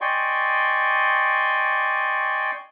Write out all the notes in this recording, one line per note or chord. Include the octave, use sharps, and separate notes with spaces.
D5 D#5 G5 G#5 C6 C#6